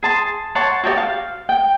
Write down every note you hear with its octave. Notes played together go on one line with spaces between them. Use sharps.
G#4 A5 C6
C#5 F#5 A5 C6
F#4 G4 D5 A5
F5
G5